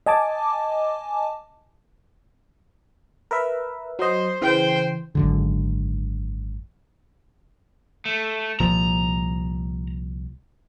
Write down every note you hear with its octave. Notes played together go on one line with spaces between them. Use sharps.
D#5 G#5 A5 D6
A#4 B4 E5
F#3 C5 D#5
C#3 E3 C5 G5
G#1 F#2 D3
A3
C2 A#2 F3 A#5